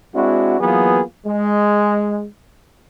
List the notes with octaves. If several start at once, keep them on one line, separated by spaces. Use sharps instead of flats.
G#3 C4 D4 E4 F#4
E3 F#3 A#3 B3 F4 G#4
G#3